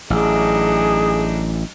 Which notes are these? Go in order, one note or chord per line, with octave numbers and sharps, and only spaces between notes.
A1 F#3 D4 D#4 G#4